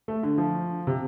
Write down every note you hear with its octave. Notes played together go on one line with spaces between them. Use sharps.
A3
D3
F3
C3